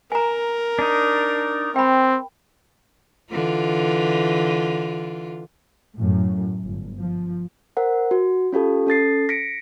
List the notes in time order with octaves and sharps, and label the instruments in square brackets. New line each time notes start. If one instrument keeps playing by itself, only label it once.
[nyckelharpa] A#4 [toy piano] G#5 A#5
[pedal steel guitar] D4 D#4
[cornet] C4 [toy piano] G5 B5
[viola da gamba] D3 E3 F4
[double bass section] F#2 A2
G1
F3
[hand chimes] A#4 C5 F#5
F#4
C#4 F4 G4 A4
C#4 A4 A6 C7
A#6 B6 C#7 D7